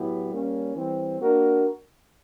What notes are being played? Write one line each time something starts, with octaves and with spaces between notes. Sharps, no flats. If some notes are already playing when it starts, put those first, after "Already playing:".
Already playing: A2 F#3 B3 E4 G4
G3 A#3 C#4
E3 G3 C4
A#3 D4 F#4 A#4